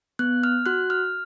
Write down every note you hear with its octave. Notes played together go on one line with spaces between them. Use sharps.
B3 F#6
F6
F#4 F#6
F6